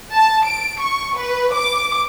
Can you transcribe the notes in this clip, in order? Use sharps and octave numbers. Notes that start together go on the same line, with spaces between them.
A5
D7
C#6
B4
D6